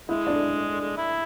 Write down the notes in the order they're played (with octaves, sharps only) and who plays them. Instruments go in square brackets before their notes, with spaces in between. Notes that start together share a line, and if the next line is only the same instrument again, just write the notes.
[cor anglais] G#3 [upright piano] E4
[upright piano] D4
[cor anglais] G#3
E4